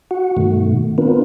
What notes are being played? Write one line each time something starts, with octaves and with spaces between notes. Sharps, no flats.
F#4 F#5
G2 B2 D#3 A3
B3 C4 D4 F4 A#4 B4